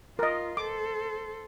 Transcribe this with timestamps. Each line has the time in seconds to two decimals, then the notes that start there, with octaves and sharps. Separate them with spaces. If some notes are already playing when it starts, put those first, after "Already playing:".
0.19 F4 A#4 D#5
0.57 A4 C5 D6